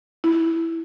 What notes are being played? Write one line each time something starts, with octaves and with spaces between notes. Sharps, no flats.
E4